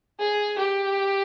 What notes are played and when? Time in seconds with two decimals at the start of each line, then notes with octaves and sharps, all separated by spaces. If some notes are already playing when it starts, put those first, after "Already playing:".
0.19 G#4
0.58 G4